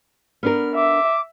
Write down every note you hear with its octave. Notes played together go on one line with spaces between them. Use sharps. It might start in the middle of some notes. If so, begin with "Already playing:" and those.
B3 D4 A#4 F6
E5 D6